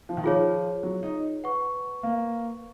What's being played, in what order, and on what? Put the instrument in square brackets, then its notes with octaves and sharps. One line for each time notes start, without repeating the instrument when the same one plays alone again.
[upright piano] F3
D#3
[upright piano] F3 [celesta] F4 G#4 C#5
[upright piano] F#3
D#4
[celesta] B4 F#5 C#6
[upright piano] A#3